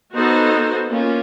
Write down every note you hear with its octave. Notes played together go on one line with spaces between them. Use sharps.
B3 D#4 F#4 A4 C5
A#3 C#4 F4